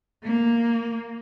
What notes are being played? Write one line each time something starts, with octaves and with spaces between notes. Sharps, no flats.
A#3